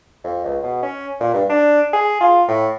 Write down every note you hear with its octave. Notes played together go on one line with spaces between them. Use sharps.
F2
C#2
B2
C#4
A#2
G2
D4
G#4
F4
A2